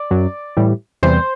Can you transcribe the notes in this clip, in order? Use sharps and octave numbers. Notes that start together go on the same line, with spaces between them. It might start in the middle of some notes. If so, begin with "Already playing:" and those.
Already playing: D5
F#2 F#3
A2 E3 G3
E2 C3 E3 G3 C5